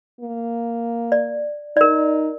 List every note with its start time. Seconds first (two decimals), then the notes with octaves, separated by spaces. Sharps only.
0.21 A#3
1.12 D5
1.76 D#4 A#4 D5